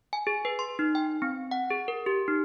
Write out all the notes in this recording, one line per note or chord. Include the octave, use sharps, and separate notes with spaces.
G#5
G#4
B4
C6
D#4
G5
C4
F#5
G#4
A#4
G4
D#4